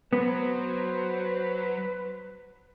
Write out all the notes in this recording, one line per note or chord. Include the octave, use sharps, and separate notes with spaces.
F#3 B3 B4 C5